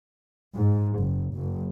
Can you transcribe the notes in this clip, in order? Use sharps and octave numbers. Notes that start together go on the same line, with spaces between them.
G#2
F#1
F#1